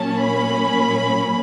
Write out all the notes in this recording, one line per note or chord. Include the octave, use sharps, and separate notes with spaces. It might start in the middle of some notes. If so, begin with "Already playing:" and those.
Already playing: A#2 F#3 A#3 C#4 A5
B5